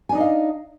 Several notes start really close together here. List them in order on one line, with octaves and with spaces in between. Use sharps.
G#5 D4 D#4 D#5 F5